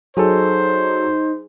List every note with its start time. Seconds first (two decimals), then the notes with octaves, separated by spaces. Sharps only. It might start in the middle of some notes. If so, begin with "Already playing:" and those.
0.17 F#3 D#4 G#4 A4 C5 G#5